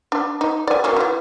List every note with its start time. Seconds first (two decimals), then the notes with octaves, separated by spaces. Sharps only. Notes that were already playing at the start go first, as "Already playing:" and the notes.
0.12 D4
0.41 D#4
0.67 D5 G#5
0.84 F#3 A#3 C#4
0.96 D#3 E3